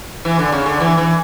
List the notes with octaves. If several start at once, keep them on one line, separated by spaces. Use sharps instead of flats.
E3
D3
C#3
D3
E3
E3